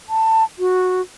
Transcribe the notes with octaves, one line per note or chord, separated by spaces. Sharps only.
A5
F#4